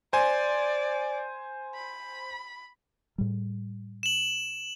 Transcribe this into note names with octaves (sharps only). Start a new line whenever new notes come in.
C5 D5 G#5
B5
A2 G3
E7 F#7